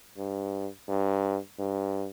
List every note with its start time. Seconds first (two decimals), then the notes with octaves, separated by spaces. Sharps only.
0.18 G2
0.88 G2
1.59 G2